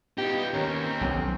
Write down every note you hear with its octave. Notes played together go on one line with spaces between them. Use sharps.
B3 D#4 F4 G4
D#2 C#4 A#4
C4
B1